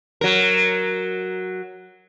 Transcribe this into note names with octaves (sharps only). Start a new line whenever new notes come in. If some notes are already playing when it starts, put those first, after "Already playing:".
F#3 A#4